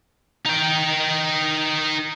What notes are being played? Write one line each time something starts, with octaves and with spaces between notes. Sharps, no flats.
D#4 G5